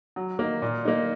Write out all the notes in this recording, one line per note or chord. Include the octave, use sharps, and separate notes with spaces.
F#3
A#3 D#4
A#2
A#3 D#4